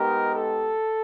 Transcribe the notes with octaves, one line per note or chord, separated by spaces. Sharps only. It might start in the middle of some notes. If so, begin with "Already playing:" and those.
Already playing: G#3 B3 D#4 G4 A#4
A4